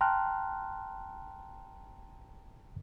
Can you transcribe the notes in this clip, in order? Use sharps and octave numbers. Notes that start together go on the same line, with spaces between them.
G5 A5 A#5 C6 F6 F#6